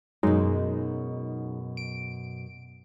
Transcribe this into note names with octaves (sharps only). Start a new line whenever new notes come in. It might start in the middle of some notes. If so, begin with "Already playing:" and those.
F#2 B2 F#3 G#3 D#4
D7